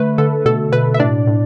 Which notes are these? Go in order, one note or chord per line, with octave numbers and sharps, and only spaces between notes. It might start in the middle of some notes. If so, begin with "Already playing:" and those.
Already playing: D3 A3 B4
D3 A4
B2 A4
B2 B4
E5
A2 D4 D5
A2